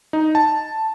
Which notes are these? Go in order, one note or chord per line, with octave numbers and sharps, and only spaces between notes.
D#4
A5